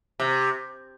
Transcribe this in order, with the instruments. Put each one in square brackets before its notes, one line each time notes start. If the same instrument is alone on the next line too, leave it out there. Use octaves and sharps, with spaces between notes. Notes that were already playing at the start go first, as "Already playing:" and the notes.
[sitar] C3